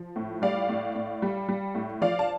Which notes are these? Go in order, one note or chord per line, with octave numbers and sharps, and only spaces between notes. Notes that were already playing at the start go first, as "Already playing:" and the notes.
Already playing: F3
A2
G3 D5 F5
A2
A2
G3
G3
A2
F3 D5 F5
A5